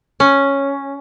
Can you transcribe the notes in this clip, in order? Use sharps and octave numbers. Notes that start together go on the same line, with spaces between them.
C#4